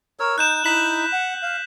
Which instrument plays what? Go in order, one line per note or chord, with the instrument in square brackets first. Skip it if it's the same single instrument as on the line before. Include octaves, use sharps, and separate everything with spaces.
[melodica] A#4 C#5 E6
[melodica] D#4 [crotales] F#6 G6 E7
[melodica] D#4 E4 [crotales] B6 F#7
[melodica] F#5
F5